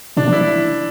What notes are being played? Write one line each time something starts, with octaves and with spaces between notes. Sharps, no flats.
B2 D4
E3
E4